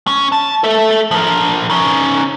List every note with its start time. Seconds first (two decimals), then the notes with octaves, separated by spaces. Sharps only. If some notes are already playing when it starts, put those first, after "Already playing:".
0.07 C#4
0.32 A5
0.64 A4 E5
1.11 F3 A#4
1.70 C#4 D#4